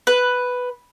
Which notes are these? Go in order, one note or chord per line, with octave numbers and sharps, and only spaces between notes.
B4